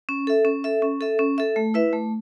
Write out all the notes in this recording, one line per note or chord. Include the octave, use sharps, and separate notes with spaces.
C#4
A4 E5
C#4
A4 E5
C#4
A4 E5
C#4
A4 E5
A3
E4 B4 E5
A3